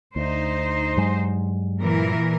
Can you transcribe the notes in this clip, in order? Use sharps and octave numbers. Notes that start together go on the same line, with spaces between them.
D2 D#4 C5
G2 F#3 G#3
A#2 E3 A#4